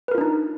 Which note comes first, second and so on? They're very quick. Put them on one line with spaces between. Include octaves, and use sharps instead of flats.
B4 A#4 F4 D4 D#4